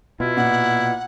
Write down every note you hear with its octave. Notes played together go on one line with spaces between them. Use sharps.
B2 E4 F4
A#2 F#5